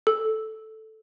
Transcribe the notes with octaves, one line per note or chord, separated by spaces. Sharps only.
A4